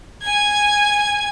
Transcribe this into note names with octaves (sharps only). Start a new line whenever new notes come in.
G#5 G#6